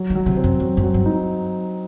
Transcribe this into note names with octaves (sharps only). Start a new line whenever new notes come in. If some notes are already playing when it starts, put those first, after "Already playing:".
Already playing: F#3
D#3
F#3
C3
C4
F#2
E2 F#3
F#2
F#3
G2
D#4